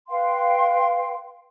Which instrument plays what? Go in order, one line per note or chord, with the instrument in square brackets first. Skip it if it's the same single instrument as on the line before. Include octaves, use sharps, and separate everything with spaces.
[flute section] B4 F5 G5 C6